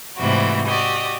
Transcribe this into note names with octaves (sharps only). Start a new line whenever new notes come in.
G#2 C3 E3 G3 A3 F#4
F#4 G4 D5 D#5